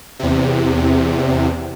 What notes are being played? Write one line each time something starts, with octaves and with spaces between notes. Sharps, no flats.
E2 C3